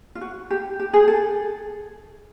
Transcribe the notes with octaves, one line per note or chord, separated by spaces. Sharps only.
F4
F#4
G4
G4
G#4
A4